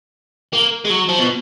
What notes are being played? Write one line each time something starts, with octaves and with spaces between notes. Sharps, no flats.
A#3
G#3
F#3
F3
B2